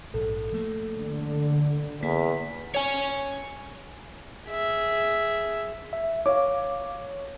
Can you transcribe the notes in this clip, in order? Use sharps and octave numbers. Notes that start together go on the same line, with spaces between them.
A#1 G#2 A4
F3 A3 A#3
D3
E2 A#3 B6
C#5 G#5
G#4 E5
E5
C#5 F5 D6